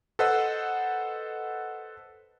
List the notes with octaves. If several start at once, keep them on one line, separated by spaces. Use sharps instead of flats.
A4 B4 C5 D#5 F#5 E6